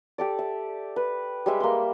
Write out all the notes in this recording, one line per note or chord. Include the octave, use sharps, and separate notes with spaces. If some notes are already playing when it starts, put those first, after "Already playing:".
G4 A4 D5
E5
B4
G3 G#3 E5
A#3 C6